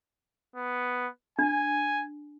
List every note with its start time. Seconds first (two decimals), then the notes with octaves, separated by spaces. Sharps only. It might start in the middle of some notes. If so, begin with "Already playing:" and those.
0.56 B3
1.39 D4 G#5